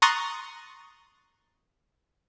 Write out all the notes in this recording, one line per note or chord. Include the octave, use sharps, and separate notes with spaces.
A#5 C6 C#6 D#6 F#6 A6